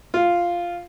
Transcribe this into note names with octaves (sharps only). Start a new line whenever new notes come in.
F4